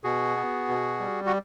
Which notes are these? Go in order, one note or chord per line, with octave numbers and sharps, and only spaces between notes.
B2 F#4 G#4
B3
B2
G3
F#4